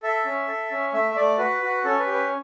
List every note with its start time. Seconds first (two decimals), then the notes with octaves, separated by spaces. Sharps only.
0.03 A4 E5
0.25 C#4
0.48 A4
0.71 C#4
0.93 A3 E5
1.11 E5
1.16 A3 D5
1.38 F#4 B4
1.62 F#4
1.85 C#4 A4
1.99 B4
2.06 G4
2.13 B4